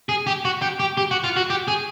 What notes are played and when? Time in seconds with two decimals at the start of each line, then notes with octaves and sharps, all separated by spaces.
0.09 G#4
0.27 G4
0.45 F#4
0.62 G4
0.80 G4
0.97 G4
1.11 F#4
1.24 F4
1.36 F#4
1.50 G4
1.68 G#4